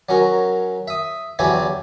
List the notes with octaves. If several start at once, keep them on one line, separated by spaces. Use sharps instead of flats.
F#3 C#4 F#4 A#4
E5 D#6
E2 D3 F#3 E4 G4 G#5